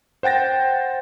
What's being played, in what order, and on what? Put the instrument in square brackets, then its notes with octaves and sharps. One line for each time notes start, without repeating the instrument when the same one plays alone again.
[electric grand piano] C5 F#5 G5 A6 A#6